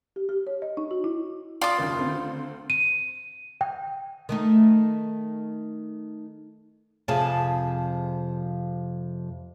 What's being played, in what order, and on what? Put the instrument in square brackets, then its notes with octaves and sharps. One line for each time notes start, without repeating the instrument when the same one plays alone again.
[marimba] G4
G4
C#5
D#5
D#4
F#4
E4
[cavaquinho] F4 D#6 [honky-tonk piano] D5
[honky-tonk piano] F#1 D#2
D2 C4
[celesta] D#7
G5
[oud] D#3 A3 D#4
[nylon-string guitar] F2 C3 F3 G#4 G#5 A5